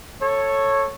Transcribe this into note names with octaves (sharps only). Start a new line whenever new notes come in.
A4 C#5